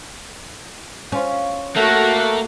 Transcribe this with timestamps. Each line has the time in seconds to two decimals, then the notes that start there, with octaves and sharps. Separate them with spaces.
1.12 C#4 F4
1.76 A3 A#3 F#4 A4 F#5